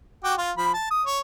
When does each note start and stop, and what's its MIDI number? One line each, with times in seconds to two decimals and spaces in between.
0.24 0.34 66
0.24 0.34 79
0.24 0.34 86
0.38 0.51 65
0.58 0.72 53
0.58 0.72 83
0.74 0.86 81
0.91 1.03 87
1.06 1.19 73